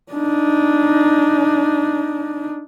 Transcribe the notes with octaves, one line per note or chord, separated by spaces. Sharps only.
D4 D#4